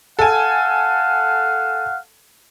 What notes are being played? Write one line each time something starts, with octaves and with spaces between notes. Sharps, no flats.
A4 F5 F#5 G#5